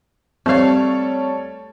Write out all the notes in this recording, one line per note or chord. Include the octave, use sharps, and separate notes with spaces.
G3 A3 C4 A4 C#5 F5